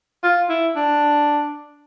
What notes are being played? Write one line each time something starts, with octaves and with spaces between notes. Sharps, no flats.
F4
E4
D4